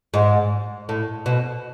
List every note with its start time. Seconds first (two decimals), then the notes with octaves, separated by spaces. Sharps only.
0.14 G#2
0.89 A2
1.26 B2